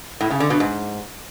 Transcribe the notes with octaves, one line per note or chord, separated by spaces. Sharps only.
A2
C#3
D3
B2
G#2